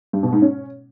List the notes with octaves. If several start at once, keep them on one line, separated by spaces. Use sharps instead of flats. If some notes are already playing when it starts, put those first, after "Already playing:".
G2
B2
G#2
C#4